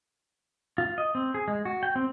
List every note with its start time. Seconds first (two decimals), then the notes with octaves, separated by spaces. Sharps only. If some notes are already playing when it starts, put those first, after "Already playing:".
0.78 F4
0.98 D#5
1.15 C4
1.34 G#4
1.48 G#3
1.65 F#4
1.83 G5
1.96 C4